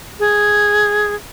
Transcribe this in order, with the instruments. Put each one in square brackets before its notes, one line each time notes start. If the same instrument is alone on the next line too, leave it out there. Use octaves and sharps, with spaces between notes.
[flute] G#4